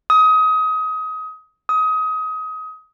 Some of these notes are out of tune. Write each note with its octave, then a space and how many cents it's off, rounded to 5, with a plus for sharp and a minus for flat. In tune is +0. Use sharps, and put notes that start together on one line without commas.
D#6 +25
D#6 +25